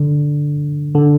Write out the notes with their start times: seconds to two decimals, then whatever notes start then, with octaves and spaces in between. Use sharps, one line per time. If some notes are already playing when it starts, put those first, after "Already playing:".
Already playing: D3
0.95 D3